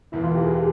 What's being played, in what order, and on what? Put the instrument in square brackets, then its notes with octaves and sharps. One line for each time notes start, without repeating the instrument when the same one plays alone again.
[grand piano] E1 E2 E3 [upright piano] E4
[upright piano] F4
G4
G#4
G4